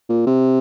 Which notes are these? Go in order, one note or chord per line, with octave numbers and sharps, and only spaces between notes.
A#2
C3